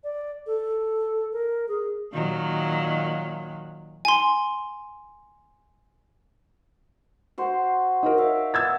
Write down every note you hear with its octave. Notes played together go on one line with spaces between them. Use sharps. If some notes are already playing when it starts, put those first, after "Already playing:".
D5
A4
A#4
G#4
A#2 D#3 F#3
G#5 C6
F#4 C5 C6
D#4 F#4 A#4
C#5 E5 F5
B3 E6 G#6 A6